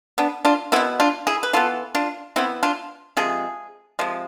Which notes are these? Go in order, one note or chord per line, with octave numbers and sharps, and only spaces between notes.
B3 D4
D4 F4
B2 G#3 B3 C4 E4
D4 F4
E4 G#4
B4
E3 B3 F4 A4
D4 F4
E3 B3 C4 E4
D4 F4
C3 F3 G#3 G#4
C3 F3 G#3